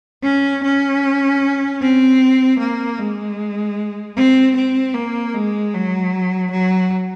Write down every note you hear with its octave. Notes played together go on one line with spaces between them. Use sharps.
C#4
C#4
C4
A#3
G#3
C4
C4
A#3
G#3
F#3
F#3